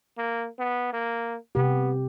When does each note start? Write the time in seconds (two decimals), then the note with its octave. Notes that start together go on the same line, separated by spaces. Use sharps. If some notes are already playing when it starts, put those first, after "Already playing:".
0.18 A#3
0.59 B3
0.93 A#3
1.55 C3 B3 G4